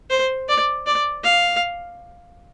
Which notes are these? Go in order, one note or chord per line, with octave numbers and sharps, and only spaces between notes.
C5
D5
D5
F5